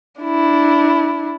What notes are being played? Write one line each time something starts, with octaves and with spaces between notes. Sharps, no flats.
D4 E4